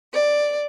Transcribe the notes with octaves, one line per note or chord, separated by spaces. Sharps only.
D5